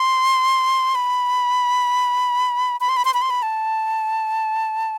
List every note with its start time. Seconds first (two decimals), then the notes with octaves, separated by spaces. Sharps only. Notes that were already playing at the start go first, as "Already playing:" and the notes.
Already playing: C6
0.95 B5
2.81 B5
2.89 C6
2.97 B5
3.05 C6
3.14 B5
3.22 C6
3.30 B5
3.42 A5